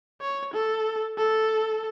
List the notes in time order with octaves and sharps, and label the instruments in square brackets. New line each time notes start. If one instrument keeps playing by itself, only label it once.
[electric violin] C#5
A4
A4